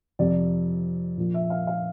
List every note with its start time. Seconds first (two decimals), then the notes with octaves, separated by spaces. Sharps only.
0.19 F2 C3 F3 D5
1.17 A#2 F3
1.34 E5
1.50 F5
1.67 F5